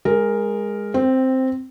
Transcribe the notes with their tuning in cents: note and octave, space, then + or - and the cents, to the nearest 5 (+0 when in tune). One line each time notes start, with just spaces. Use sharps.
G#3 -15 A#4 +0
C4 +0 G5 -20